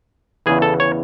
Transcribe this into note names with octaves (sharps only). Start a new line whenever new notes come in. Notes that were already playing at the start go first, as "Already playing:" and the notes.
E2 C#3 E3 G#4
A4
C#5